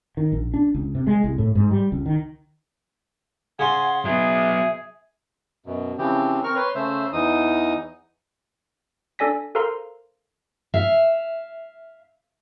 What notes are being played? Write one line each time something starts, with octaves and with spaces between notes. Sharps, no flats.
D#3
A#1
D4
C#2
C3
G#3
C2
A2
G#2
G3
C#2
D#3
C#3 F#5 G#5 C6
F#3 B3 G#4 E5
F#2 B2
C#3 E3 F3 C4 G4
C4 A#4 C#6 F6
B4 C#5 C6
C#3 A3 C5 E5
E2 E3 D#4 D#6
D4 A4 D5 G#5 A#6 B6
A4 A#4 C5 F5 A#5 C6
E5 F5